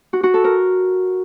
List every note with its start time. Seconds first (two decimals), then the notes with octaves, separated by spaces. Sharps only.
0.13 F#4
0.23 F#4
0.34 A4
0.44 A#4